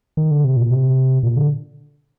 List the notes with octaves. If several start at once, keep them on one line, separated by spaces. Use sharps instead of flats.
D#3
D3
C3
A#2
C3
A#2
D3